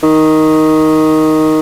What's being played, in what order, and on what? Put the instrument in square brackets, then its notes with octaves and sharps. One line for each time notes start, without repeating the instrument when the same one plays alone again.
[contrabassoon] D#3